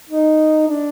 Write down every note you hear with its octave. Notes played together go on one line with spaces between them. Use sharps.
D#4
D4